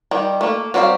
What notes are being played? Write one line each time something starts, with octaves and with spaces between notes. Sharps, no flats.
D#3 G3
A3 A#3
F#3 G3 C4 C5 F5